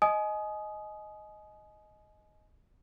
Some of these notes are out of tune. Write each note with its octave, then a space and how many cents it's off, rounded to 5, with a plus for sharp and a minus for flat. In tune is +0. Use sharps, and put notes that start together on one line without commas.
D#5 +0 G#5 +30 D#6 +0